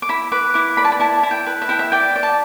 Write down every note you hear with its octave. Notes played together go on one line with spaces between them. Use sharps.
D6
E4 B5
B4 D6
E4 D6
D5 B5
A5
B5
E4 A5
E4
G5
B4
E5
E4 G5
E5
D5 G5
D5
A5